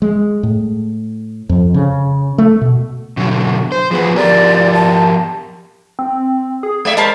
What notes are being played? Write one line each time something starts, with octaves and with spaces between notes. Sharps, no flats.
G#3
A2
F2
C#3
A3
B2
B2 D3 F#3
C5
F3 B3 G#4 B4
F3 G4 A#4 D5
A5
C4
G#4
G#3 D5 E5 G#6
G#3 C4 A#4 A5 B5